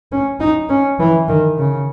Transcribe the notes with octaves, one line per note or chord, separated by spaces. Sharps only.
C#4
D#4
C#4
E3
D#3
C#3